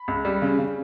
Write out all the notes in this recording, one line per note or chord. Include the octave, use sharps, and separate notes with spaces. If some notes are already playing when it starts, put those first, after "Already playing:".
Already playing: B5
C#2
G3
C#3
C#3